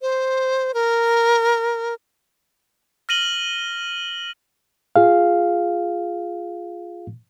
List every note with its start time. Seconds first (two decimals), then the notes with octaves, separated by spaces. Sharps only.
0.01 C5
0.74 A#4
3.09 F6 A#6 D#7 F#7 G7
4.96 F4 G#4 F5